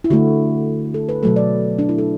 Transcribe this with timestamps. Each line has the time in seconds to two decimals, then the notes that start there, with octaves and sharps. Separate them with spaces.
0.04 E4
0.10 D3 A3 F#4
0.94 A4
1.09 B4
1.23 B2 F#3 A3 A4
1.36 D5
1.79 D4
1.89 E4
1.98 A4